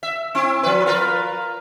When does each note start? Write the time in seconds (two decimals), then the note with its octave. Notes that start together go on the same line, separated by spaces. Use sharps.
0.03 E5
0.35 C4 E4
0.63 F3 B4
0.86 F4 A#4 B4